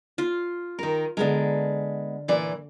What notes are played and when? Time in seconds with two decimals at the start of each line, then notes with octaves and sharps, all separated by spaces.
0.18 F4
0.79 D#3 A#4
1.17 D3 G#3 B3 A#4
2.28 A#2 E3 D5